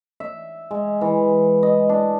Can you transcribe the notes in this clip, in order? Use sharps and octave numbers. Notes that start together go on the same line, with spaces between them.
E5
G#3
E3
D#5
D4